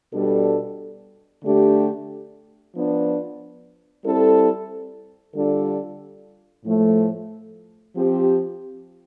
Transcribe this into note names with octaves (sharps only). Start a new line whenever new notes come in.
B2 G3 D4 A4
D3 A3 D4 G4
F3 B3 D4
G3 C4 E4 A4
D3 G3 D4 F4 A4
A2 F3 A3
F3 C4 G4